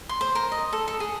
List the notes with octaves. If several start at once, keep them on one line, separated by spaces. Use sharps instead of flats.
C6
C5
A#4
D#5
A4
A4
G#4